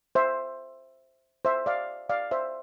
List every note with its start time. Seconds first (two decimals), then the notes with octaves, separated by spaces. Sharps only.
0.15 C5 E5
1.45 C5 E5
1.66 D5 F5
2.09 D5 F5
2.31 C5 E5